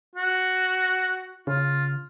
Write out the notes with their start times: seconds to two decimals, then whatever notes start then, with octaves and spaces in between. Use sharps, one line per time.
0.16 F#4
1.47 C#3 F4